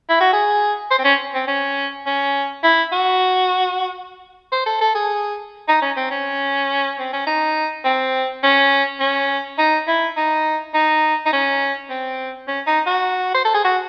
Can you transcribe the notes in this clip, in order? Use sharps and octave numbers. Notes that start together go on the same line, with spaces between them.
E4
F#4
G#4
C5
C4
C#4
C4
C#4
C#4
E4
F#4
C5
A4
A4
G#4
D#4
C#4
C4
C#4
C4
C#4
D#4
C4
C#4
C#4
D#4
E4
D#4
D#4
D#4
C#4
C4
C#4
D#4
F#4
C5
A4
G#4
F#4